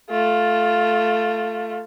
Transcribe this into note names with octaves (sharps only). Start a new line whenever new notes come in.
A3 F4